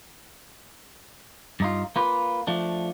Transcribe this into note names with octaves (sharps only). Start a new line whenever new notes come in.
G2 D#4 F4
A#3 F4 B4
F3 A3 D4